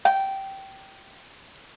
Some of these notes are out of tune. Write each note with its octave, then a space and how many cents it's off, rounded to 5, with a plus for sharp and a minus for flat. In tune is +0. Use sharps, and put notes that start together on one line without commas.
G5 -15